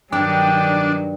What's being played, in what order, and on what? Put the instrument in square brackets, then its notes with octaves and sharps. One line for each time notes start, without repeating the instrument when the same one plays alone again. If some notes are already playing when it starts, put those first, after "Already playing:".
[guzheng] G2 [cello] D#3 F#3 [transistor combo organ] D4 [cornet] G5